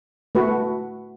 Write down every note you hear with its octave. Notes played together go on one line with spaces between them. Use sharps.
A3 F#4 B4